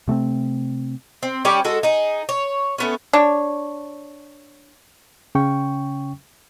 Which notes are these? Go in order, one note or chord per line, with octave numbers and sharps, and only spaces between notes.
C3 A3 B3 C4
C4
G3 C#4 G4 D5
G#3 F#4 A4
D#4 G#4
C#5
A3 B3 C#4
D4 C#5
C#3 C#4 G5 C#6